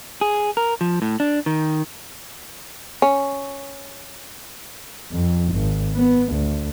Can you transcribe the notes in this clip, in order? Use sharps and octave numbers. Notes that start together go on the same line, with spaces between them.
G#4
A#4
F3
A2
D4
D#3
C#4
F2
G#1
B3
D2